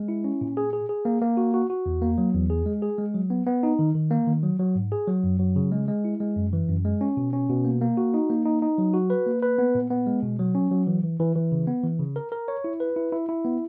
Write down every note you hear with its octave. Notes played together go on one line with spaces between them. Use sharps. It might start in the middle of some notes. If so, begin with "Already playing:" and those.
Already playing: G#3
E4
C#4
A#2
G#4
G#4
G#4
A#3
A#3
F#4
F#4
F#4
E2
A#3
F#3
E2
G#4
G#3
G#4
G#3
F#3
B3
B3
D#4
D#3
D#3
A#3
D#3
F#3
F#3
G#2
G#4
F#3
F#2
F#3
C#3
G#3
G#3
E4
G#3
F#2
E3
F#2
G#3
C#4
B2
C#4
B2
A#3
A#3
F#4
D#4
A#3
D#4
D#4
F#3
F#4
B4
A#3
B4
B3
A#2
B3
G#3
B2
F#3
C#4
F#3
E3
E3
E3
E3
C#3
B3
E3
C#3
A#4
A#4
C#5
E4
B4
E4
E4
E4
B3